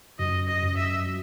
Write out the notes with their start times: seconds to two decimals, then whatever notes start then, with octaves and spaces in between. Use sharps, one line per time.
0.19 F#2 D#5
0.48 D#5
0.62 F#2
0.77 E5
1.06 F#3